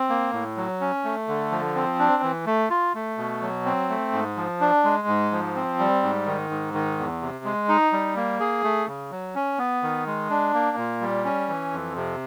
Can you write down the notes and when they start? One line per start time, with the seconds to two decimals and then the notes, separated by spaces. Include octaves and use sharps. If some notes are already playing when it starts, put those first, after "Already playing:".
Already playing: C4
0.09 A#3
0.33 A2
0.57 F#3
0.81 C#4
1.04 A3
1.28 D3
1.51 F3
1.75 C4
1.99 D4
2.23 E3
2.46 A3
2.70 F4
2.94 A3
3.18 B2
3.42 F#3
3.65 C4
3.89 A3
4.12 G#2
4.36 F3
4.61 D4
4.84 G#3
5.08 G#2
5.32 F3
5.55 C4
5.79 G3
6.03 G#2
6.26 D#3
6.50 G#2
6.74 D#3
6.98 E2
7.21 C3
7.45 G#3
7.68 D#4
7.92 G3
8.16 A#3
8.40 G#4
8.64 A3
8.87 C#3
9.11 F#3
9.35 C#4
9.58 B3
9.83 D#3
10.06 G#3
10.30 D4
10.54 A#3
10.77 A#2
11.01 G3
11.25 C#4
11.48 E3
11.72 F2
11.96 C3